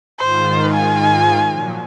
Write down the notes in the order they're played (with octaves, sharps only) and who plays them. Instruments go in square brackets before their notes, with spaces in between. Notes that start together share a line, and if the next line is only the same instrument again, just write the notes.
[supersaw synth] G#2 D#3 F4 [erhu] C5
[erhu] G#5
[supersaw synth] A#2 F3 F#3